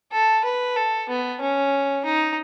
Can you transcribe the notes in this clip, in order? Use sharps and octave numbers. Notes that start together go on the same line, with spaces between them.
A4
B4
A4
B3
C#4
D#4